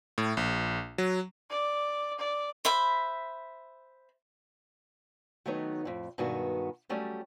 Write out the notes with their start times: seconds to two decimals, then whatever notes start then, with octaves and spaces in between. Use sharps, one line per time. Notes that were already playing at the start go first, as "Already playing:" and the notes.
0.18 A2
0.37 A#1
0.98 F#3
1.50 D5
2.19 D5
2.65 C5 E5 B5
5.46 D#3 F#3 A3 B3 D#4 C#5
5.85 F2 A2
6.18 G2 B2 D#3 G#3 B3 F#4
6.89 F#3 G3 A3 C#4